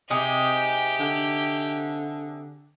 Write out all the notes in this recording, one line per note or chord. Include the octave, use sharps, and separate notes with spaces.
C3 D#4 G4 G#4
D3